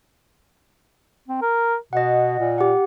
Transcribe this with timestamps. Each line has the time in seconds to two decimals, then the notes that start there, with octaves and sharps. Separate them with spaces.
1.28 C4
1.42 A#4
1.93 B2 D#5 F#5
2.39 A#2
2.58 G4 F#5